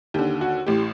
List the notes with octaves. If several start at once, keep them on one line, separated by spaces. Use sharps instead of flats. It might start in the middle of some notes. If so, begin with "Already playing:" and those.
D#2 D3 G4
F#4
A1 A2 G4